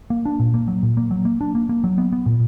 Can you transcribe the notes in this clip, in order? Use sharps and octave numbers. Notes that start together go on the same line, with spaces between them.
A#3
D4
A#2
A#3
F#3
A#2
A#3
F#3
A#3
D4
A#3
A#3
F#3
B3
B3
A#2